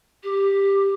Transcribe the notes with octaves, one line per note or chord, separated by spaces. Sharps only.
G4